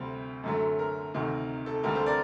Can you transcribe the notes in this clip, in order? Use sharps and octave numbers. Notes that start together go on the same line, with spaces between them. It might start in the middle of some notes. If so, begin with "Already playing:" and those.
Already playing: D2 C3 G3 C5
F#2 D3 F#3 A3
A#4
D2 C3 D#3
A4
D2 D3 G3 A#4
A4 C5
A#4 D5